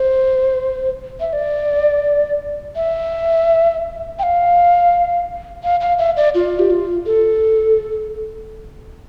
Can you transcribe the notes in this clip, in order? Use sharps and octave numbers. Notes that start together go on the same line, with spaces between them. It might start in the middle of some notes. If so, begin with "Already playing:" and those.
Already playing: C5
E5
D5
E5
G5
F5
F5
F5
E5
D5
F4
G4
F4
A4